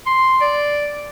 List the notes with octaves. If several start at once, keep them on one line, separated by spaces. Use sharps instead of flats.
C6
D5